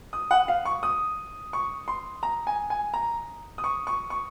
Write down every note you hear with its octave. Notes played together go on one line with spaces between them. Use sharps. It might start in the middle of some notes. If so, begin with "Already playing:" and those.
D#6
F#5
F5
C#6
D#6
C#6
C6
A#5
G#5
G#5
A#5
D#6
C#6
C#6
C#6